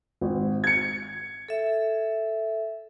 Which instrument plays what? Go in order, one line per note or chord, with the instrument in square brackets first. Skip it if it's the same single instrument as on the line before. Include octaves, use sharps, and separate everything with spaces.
[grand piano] G#1
G#6 C#7
[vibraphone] A4 E5